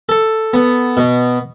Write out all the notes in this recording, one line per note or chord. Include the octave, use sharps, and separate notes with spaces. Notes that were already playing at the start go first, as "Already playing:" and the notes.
A4
B3
B2